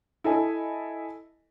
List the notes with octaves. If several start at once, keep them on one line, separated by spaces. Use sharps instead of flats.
E4 A4 D#5 G#5